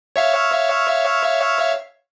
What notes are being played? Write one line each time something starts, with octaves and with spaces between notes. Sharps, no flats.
C#5 E5 F5